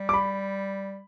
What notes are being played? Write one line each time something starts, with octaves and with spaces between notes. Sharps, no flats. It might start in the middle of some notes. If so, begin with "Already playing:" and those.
Already playing: G3
D6
B5